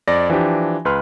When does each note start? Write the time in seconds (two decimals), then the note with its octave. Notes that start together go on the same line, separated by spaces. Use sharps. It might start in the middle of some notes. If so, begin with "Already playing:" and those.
0.08 F2 D5 A#6
0.30 E3 F3 D4 G4
0.85 C#2 B4 C6 F6